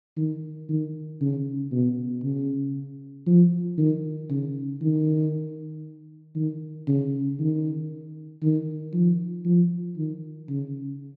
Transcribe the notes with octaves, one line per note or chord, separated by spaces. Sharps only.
D#3
D#3
C#3
B2
C#3
F3
D#3
C#3
D#3
D#3
C#3
D#3
D#3
F3
F3
D#3
C#3